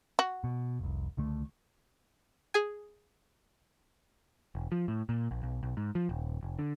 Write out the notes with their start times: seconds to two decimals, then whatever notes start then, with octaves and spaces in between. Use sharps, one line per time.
0.19 F#4
0.44 B2
0.79 F1 C2
1.17 C#2 D3 A3
2.54 G#4 G#5
4.55 E1
4.72 F3
4.88 A2
5.09 A#2
5.31 A#1
5.43 B1
5.63 B1
5.77 G#2
5.95 F3
6.09 D#1
6.43 F1
6.59 D3